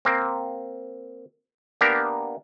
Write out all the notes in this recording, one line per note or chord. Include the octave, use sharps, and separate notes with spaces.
A#3 C4
A#3 B3 D4 G4 A#4